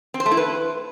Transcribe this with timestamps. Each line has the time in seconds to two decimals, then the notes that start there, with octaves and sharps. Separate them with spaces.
0.14 C4
0.20 C5
0.26 A3
0.31 E4
0.37 B4